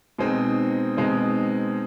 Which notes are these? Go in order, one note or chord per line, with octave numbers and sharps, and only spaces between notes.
B2 G#3 C4 D#4
B2 G#3 C4 D#4